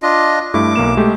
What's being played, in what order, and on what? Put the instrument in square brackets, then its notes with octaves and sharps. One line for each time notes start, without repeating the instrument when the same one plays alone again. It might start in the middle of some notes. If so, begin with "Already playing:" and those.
[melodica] D4 F4 D#5
[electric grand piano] G2 A3 E4 [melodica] D6
[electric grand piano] B1 A#3 E7
G#3 A3 G4